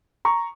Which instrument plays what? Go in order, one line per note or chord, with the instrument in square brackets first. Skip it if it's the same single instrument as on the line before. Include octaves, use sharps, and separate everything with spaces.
[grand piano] A#5 C#6